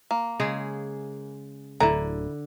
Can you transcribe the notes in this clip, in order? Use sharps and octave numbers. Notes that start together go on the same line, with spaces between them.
A#3
C#3 G#3 G#4
D1 D3 E4 A#5